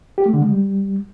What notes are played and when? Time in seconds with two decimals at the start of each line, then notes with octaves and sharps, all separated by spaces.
0.18 G4
0.26 A3
0.34 D3
0.41 G#3
0.49 G3